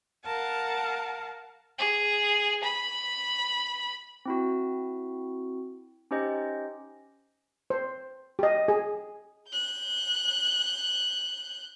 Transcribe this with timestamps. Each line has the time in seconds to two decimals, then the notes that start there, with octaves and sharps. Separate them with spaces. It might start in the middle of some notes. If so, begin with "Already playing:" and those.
0.25 A#4 F5 F#5 A5
1.78 G#4
2.63 B5
4.25 C4 E4 F#4
6.11 C#4 D#4 G4 C5 D#5
7.70 C5
8.39 G4 D#5
8.68 G#4
9.48 F#6 G6